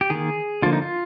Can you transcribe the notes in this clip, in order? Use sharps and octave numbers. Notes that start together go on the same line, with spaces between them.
G4
D#3 A#3 G#4
D3 F3 A#3 F4
D#4
F4